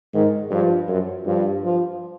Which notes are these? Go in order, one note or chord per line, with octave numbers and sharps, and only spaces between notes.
G#2 D#3
G2 F3
F#2
G2 F3
F3